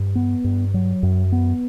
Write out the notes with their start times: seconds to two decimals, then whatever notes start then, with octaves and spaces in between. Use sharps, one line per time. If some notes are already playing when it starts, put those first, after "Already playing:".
Already playing: G2
0.15 B3
0.44 G2
0.74 F#3
1.03 F#2
1.32 B3